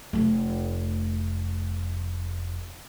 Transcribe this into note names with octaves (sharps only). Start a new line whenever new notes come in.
F1 A3